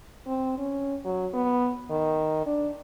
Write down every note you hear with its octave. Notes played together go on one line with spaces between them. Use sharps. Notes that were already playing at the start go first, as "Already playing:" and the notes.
C4
C#4
F#3
B3
D#3
D4